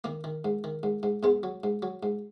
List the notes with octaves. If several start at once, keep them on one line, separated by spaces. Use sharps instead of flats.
D#3 A#3
D#3
G#2
D#3
G#2
G#2
G#2 G#3 B3
F#3
G#2
F#3
G#2